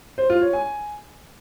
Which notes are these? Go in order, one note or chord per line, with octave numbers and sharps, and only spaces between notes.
C5
F4
C#5
G#5